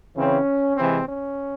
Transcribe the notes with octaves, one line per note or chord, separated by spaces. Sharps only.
C#3 E3 C4 C#4
C3 E3 G#3 C4
C#4